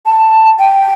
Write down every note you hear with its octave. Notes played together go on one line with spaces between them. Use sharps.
A5
G5